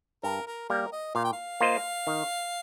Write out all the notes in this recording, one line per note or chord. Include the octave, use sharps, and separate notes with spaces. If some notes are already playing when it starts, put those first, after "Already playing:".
G2 A#4
A#4
G3 A#3 A#4
D#5
A#2 F5
G5
F5
A#3 F4 C5 D#5
D#3